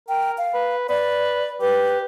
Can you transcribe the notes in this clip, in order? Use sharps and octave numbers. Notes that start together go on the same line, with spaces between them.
A#4 G5
F5
B4
B4 D5
G4 B4